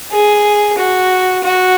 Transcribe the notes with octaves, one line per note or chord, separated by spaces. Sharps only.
G#4
F#4
F#4